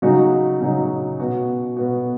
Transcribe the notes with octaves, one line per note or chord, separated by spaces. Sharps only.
C#3 F#3 D#4 F#4
C#3 F#3 D#4 F#4
B2 B3 F#4
B2 B3 F#4